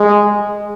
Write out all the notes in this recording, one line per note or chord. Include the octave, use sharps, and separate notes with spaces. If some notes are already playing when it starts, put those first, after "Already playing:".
Already playing: G#3